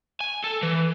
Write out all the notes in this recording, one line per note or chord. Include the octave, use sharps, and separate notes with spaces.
G#5
A4
E3